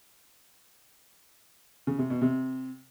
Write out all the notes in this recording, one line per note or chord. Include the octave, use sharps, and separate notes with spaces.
C#3
C3
B2
C3